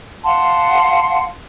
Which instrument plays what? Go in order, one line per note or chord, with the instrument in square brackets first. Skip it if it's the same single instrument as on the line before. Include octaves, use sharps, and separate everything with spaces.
[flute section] F5 F#5 A5 C6